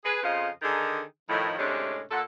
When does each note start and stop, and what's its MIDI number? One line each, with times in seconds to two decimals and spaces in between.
0.05 0.23 68
0.05 0.23 71
0.23 0.49 41
0.23 0.49 49
0.23 0.49 53
0.23 0.49 72
0.23 0.49 75
0.23 0.49 77
0.62 1.02 50
0.62 1.02 51
0.62 1.02 63
0.62 1.02 68
1.29 1.53 45
1.29 1.53 51
1.29 1.53 53
1.58 2.01 45
1.58 2.01 48
1.58 2.01 56
1.58 2.01 61
1.58 2.01 62
2.11 2.21 46
2.11 2.21 69
2.11 2.21 78